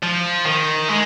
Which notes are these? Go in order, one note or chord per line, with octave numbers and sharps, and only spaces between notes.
F3
D#3
G#3